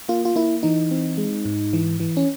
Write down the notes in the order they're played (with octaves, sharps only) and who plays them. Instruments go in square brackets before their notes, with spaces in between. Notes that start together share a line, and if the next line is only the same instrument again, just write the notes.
[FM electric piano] A#3 F4
F4
A#3 E4
E3 D#4
C4
G#3
G#2
E3
E3
C#4